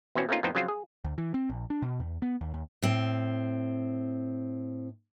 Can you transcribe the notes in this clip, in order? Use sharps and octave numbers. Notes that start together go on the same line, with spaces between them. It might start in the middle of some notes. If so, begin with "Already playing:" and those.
B2 E3 C4 C#4 F#4
A3 A#3 C4 C#4 D#4 F4
F2 A2 B3 D#4 C5 G5
C#3 F3 F#3 C4 F4 C5
G#4
D2
E3
C4
A#1
D4
B2
E2
B3
D#2
D#2
A2 C4